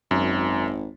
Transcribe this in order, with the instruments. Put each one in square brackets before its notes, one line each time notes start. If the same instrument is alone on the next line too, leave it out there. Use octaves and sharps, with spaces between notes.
[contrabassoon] G#1 [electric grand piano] F#2